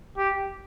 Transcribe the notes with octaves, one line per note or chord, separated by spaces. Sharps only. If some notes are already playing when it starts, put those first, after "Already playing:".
G4